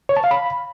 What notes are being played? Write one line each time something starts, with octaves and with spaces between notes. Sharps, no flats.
C#5
A5
F5
B5